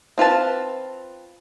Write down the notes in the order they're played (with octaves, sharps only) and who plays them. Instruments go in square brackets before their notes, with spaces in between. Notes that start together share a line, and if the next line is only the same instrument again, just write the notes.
[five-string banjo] C4 F4 B4 A5